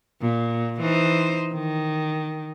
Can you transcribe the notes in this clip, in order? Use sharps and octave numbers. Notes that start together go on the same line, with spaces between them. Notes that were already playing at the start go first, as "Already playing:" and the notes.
A#2
E3 D#4 C5
D#3